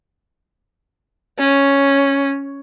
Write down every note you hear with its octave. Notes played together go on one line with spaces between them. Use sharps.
C#4